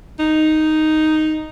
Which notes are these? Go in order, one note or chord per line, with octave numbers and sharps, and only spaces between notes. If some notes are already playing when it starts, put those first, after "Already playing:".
D#4